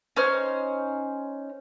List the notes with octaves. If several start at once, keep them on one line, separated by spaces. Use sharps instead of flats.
C#4 D#4 C5 F6